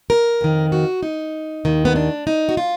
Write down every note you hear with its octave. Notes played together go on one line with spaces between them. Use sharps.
A#4
F2 D#3
F#4
D#4
D#2 D#3
B3
D4
D#4
F#4
F4